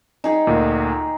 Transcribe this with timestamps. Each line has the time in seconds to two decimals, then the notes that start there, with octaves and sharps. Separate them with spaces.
0.24 D#4 G#4 G5
0.47 D2 A#2